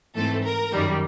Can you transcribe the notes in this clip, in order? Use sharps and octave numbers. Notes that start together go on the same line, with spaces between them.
G#2 E3 A3 C4 A4
A#4
F#2 D#3 G3